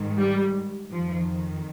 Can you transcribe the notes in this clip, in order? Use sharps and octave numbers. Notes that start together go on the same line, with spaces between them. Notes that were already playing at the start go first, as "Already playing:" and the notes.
Already playing: G#2 D#3
G3
F2 D#3 F3